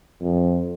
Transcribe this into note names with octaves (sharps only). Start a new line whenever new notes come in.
F2